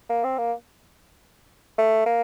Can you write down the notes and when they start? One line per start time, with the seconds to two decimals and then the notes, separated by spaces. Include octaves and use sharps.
0.10 A#3
0.24 C4
0.38 A#3
1.78 A3
2.06 A#3